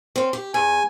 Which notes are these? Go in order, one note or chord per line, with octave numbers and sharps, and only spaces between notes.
C4 C#4
G4
E2 G#5